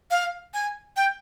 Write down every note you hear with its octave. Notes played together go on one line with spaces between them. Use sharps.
F5
G#5
G5